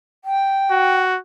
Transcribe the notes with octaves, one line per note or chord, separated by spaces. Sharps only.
G5
F#4